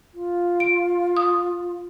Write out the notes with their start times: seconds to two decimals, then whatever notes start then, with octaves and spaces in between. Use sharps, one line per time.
0.14 F4
0.60 D7
1.17 D#6